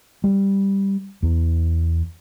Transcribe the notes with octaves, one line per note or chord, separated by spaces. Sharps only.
G3
E2